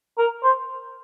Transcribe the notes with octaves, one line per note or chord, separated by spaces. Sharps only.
A#4
C5